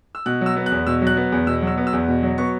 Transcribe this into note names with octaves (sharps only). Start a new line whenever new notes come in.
E6
B2 F#6
F#3
E6
B3
F#6
E2
B2 E6
F#3 F#6
B3
E2
B2 E6
F#3 E6
B3
E6
E2
B2
F#3
B3 C#6